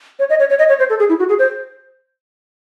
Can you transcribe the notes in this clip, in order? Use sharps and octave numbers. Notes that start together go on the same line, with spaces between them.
C#5
D#5
C#5
C#5
D#5
C#5
C5
A4
G#4
E4
F#4
G#4
C5